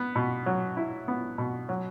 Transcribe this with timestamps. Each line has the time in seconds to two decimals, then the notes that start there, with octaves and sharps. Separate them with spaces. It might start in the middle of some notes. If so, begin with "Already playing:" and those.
Already playing: B3
0.16 B2
0.46 F#3
0.77 E4
1.08 B3
1.38 B2
1.69 F#3